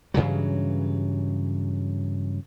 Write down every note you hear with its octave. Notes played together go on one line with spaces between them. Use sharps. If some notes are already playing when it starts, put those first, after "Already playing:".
G2 C#3 E3 F#3